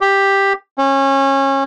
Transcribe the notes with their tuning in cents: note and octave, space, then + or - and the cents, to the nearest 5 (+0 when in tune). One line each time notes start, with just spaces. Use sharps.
G4 +5
C#4 -25